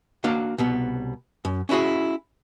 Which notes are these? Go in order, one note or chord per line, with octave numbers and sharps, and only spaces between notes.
A#3 D4 F#4 F5
C2 B2 B3
F#2
C#4 D4 E4 F#4 G#4